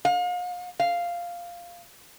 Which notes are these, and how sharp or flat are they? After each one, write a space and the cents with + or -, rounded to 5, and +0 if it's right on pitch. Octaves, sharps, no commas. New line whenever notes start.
F5 +40
F5 -5